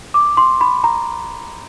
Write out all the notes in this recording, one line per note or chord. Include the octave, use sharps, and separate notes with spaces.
D6
C6
B5
A#5